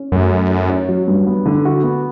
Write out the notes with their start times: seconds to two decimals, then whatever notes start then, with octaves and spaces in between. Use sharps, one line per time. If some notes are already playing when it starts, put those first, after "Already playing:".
Already playing: C#4
0.12 F#2 A3
0.31 A3
0.50 C#4
0.70 C#4
0.89 F#3
1.08 G2
1.27 B3
1.46 D3
1.65 F#4
1.84 B3